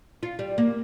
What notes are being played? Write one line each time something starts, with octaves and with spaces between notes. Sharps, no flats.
F4
G3
A#3